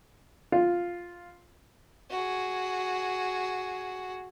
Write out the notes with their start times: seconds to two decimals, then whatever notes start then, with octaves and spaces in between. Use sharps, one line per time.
0.52 F4
2.11 F#4 G#4